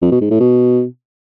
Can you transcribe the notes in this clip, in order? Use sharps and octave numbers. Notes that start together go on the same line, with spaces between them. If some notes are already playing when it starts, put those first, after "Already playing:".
F2
B2
G#2
A2
B2